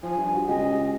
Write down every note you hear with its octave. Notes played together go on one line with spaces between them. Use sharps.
F3 G#5
G2
F#4
C#2 G4 G#4 D#5